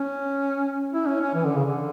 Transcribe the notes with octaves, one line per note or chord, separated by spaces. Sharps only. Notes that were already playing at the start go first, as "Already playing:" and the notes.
Already playing: C#4
E4
C#4
C#4
E3
D3
C#3
D3